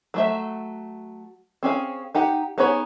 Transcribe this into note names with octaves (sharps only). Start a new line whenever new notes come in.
F#3 A3 E5
C4 C#4 G#4 F5
D#4 G4 F#5
B3 D#4 G#4 C#5 B5